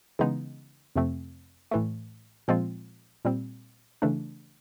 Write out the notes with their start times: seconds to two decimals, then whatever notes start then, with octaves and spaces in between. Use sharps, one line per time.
0.19 C#3 E3 G#3 B3 D#4
0.96 F2 C3 F3 A3 C4
1.71 A2 E3 A3
2.48 A#2 F3 G#3 C4 F4
3.25 A#2 G3 C4
4.02 C#3 E3 A3 D4